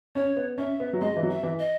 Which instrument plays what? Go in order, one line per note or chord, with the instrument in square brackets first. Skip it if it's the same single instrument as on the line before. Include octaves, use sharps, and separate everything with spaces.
[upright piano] C#4 [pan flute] C#5
[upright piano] B3
[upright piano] C#4 [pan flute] E5
[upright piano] B3
F#3
[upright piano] G#3 [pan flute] D#5
[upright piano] E3
F#3
[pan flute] E5
[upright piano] E3
[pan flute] D#5